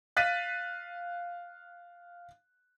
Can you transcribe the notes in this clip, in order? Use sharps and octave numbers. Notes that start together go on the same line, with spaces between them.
F5 F#6 A6 B6 D#7